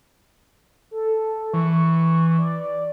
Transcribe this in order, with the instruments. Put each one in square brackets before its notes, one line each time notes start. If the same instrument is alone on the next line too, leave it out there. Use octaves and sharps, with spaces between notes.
[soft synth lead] A4
[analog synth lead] E3 [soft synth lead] C#6
[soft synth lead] D5